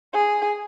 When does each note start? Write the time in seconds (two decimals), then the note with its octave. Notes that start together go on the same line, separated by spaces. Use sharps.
0.14 G#4